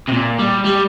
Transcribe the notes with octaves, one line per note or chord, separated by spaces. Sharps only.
C3
A#2
G3
G3